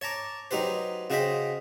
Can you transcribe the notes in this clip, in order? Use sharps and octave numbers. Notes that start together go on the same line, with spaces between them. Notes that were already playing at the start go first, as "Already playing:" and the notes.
C#5 A5 A#5 D6
F#3 D#4 G4 B4 C5
C#3 F#4 C5 D#5 G5 B5